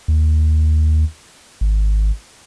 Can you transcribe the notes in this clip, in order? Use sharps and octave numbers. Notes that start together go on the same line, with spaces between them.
D#2
G#1